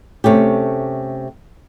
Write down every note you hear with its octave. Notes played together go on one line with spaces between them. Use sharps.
C3 A3 C#4 G4